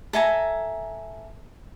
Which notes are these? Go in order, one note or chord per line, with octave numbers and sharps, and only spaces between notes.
A4 E5 G#5 A#5